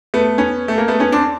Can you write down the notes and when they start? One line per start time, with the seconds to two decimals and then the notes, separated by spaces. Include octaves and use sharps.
0.14 A3 B3
0.38 B3 C#4
0.68 A3
0.78 A#3
0.88 A3 B3
1.00 B3 C#4
1.12 C4 D4